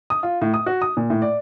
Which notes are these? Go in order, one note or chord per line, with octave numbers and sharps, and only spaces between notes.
D#6
F4
A2
D#6
F#4
D#6
A#2
A2
D5